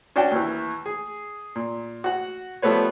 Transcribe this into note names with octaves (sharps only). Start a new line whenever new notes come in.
C#4 D4 F#4 G5
D#2 E3
G#4
A#2
F#4 F#5
F3 G3 A3 B3 B4 C#5